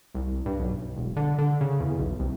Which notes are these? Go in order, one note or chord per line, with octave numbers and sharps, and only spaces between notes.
C2
G2
B1
E1
D3
D3
C#3
E2
B1
C2